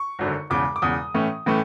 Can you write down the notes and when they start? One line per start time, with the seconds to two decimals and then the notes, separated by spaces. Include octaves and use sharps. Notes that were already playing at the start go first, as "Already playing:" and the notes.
Already playing: C#6
0.19 G#1 F#2 D3
0.50 E1 E2 C#3 D6
0.76 D6
0.82 E1 E2 C#3 D#6
1.14 A2 E3 A3 C#4
1.46 A2 E3 A3 C#4